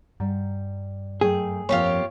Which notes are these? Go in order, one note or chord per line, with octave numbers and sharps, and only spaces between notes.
G2 G3
F#2 A3 G#4 G5
F2 A#3 F4 G4 C#5